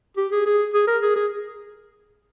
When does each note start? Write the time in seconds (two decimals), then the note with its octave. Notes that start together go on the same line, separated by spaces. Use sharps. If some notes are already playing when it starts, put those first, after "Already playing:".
0.17 G4
0.32 G#4
0.46 G#4
0.74 G#4
0.88 A#4
1.02 G#4
1.16 G#4